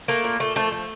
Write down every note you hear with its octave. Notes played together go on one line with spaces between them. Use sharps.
A3 A#3
A#2
A#2 A3
F3 A3
A3